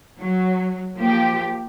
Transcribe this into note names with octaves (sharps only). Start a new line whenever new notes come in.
F#3
F3 A#3 G4